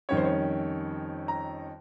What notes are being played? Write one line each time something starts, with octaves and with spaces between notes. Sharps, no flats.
F2 D#3 G3 C#4 C#5
C5
C#5
A#5